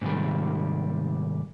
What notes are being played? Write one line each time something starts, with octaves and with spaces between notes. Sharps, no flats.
G#2 C3 D#3 G3